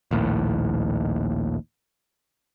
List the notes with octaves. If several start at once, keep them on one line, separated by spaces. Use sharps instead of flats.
A#1 D#2 A2